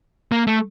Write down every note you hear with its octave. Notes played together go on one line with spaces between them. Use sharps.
A#3
A3